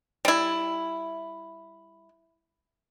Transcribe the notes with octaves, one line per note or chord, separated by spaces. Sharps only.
G3 E4